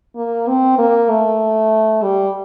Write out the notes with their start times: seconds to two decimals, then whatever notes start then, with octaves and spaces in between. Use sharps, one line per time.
0.16 A#3
0.48 C4
0.78 A#3
1.09 A3
2.03 G3